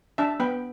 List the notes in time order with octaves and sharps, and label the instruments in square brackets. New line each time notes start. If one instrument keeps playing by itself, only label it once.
[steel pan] D4 E5 A5
B3 G5 B5